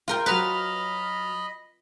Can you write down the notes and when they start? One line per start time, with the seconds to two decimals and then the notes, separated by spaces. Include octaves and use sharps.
0.08 F4 A#4 G5
0.26 F#3 B4 D#5 B5 F6 A6